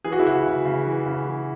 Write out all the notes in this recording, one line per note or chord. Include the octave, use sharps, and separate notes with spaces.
E3 G#4
F#4
E4
C#3 F#4
C#3
C#3
E3
C#3
E3